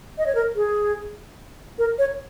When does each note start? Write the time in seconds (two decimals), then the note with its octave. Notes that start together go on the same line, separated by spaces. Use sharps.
0.18 D#5
0.27 C#5
0.35 A#4
0.56 G#4
1.79 A#4
1.98 C#5